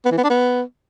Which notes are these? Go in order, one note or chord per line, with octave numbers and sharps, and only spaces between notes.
B3
E3
B3
D4
B3